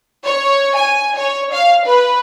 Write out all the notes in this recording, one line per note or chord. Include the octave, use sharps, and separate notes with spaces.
C#5
G#5
C#5
F5
B4